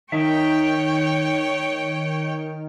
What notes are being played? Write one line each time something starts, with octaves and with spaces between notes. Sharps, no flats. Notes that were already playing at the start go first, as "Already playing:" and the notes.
D#3 D#4 C#5 E5 G5